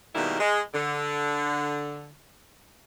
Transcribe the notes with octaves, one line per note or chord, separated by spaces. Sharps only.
B2 D#3 G3 G#3 A#3 E4
G#3
D3